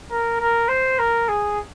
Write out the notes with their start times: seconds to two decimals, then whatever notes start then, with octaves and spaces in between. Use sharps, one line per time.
0.11 A#4
0.40 A#4
0.69 C5
0.99 A#4
1.29 G#4